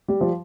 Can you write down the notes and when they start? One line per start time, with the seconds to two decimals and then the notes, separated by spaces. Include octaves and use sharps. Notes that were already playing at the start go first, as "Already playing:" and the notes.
0.08 G3
0.21 F3